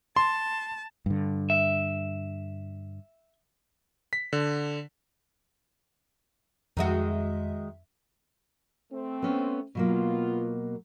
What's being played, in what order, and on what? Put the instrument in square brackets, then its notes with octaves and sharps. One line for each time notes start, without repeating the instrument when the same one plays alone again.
[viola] A5 [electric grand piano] C6
[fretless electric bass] G2 D3
[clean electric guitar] E5
[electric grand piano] B6
D3
[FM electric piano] F2 E5 [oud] D#3 G#3 F#4
[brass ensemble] A3 C4
[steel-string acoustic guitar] B3 C#4
[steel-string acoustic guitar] B2 F#3 A#3 [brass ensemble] B3 F4